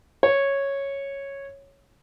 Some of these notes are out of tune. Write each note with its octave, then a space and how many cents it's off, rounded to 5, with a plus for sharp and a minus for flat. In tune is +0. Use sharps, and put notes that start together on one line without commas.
C#5 -5